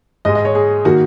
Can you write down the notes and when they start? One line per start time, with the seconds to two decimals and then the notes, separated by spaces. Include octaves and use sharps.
0.25 G#2 G#3 D#5
0.35 D#5
0.45 C#5
0.55 G#4
0.85 D#3 A#3 F#4